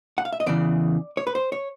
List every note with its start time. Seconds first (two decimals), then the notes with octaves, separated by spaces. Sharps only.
0.18 F#5
0.25 F5
0.33 E5
0.40 D#5
0.46 E2 C#3 E3 D5
1.17 C#5
1.27 B4
1.35 C5
1.52 C#5